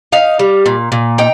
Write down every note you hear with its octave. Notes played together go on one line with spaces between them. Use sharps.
D#4 F5
G3
A#2
A#2
D#4 G5